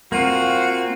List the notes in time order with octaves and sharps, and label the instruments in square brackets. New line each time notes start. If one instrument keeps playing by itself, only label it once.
[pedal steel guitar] A#3 F4 [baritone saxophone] C4 [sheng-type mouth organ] F#4